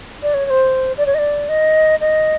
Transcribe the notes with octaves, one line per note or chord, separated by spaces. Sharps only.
D5
C#5
C#5
C5
D5
C#5
D#5
D5
D#5
D#5